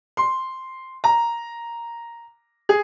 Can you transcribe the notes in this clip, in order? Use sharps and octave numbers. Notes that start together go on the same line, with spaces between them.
C6
A#5
G#4